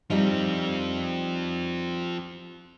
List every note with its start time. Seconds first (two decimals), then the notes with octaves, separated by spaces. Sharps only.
0.10 F3 G3 C4 D#4 F4